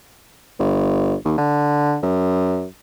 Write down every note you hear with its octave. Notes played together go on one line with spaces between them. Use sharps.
G1
D#2
D3
F#2